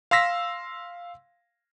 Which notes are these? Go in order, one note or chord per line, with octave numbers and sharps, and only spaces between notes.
F5 C6 E6 A#6 B6